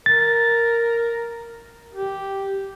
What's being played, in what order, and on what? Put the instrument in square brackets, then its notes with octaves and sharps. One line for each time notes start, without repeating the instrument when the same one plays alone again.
[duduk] A#4 [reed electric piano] A6
[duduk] G4